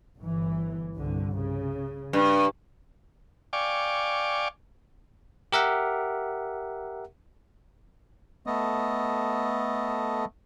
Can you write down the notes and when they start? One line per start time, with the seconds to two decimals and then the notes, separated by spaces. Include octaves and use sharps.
0.18 G1 E3
0.95 C2 G2 D3
1.37 C#3
2.13 G2
3.53 D5 F5 G5 G#5 C#6 D6
5.52 G4 A#4 E5 F#5
8.47 A3 B3 A4 D#5